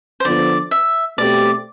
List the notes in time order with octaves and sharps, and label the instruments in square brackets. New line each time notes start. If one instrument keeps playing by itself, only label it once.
[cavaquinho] C5
[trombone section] D3 F3 B3 [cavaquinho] D5
[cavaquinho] E5
[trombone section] B2 A3 C4 G4 [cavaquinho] D5